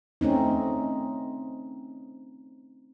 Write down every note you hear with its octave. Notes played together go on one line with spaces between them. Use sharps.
A3 C4 C#4 D#4